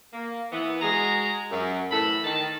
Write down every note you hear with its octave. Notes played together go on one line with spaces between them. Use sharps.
A#3
E3 B3
G#3 F#4 G#4 A#5
F#2
A2 E3 A4 B5
D#3 A5